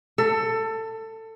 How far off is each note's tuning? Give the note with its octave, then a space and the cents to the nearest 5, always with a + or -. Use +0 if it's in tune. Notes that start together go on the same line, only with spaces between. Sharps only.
A4 +20